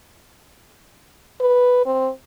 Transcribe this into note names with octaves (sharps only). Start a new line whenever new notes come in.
B4
C4